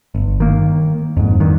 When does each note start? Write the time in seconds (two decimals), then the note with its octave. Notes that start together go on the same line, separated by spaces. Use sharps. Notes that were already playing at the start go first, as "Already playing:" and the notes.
0.14 G1
0.40 D#3 A#3
1.17 F2 G#2
1.40 G2 D#3